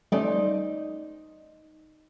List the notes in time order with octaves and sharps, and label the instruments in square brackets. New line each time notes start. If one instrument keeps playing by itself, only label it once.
[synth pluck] G3 A3 C#4 [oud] D#4 C5 D5